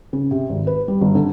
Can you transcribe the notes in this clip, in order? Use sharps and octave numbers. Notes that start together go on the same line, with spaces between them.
C#3
C3
G#1
B4
G3
G1
D3